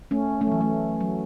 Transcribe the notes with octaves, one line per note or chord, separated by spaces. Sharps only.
A3 C#4
A3 C#4
F#3
E3
A3
F#3